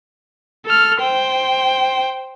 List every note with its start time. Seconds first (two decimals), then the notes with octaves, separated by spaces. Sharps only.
0.66 A4 F6
1.00 C5 G5